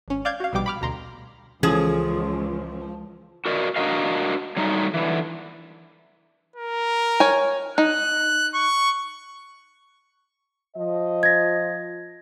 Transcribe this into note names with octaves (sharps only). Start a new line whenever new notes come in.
G#1 C#4
D5 F5 D6 G6 G#6
F#4 F5
A#1 B2 G3 G5 D6
B5 D6 F6
D2 B2 A#5 C6
C#2 E3 F3 C#4 G#4
F#4 A#4 D5 D#5
D4 F#4 G4 A#4 D#5 F5
F#3 G3 A3 D#4
D3 E3
A#4
C#5 G#5
D#4 F#6
C#6
F3 D#5
G#6 A#6